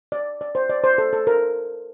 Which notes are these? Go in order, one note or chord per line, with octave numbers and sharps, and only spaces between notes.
D5
D5
C5
D5
C5
A4
A4
A#4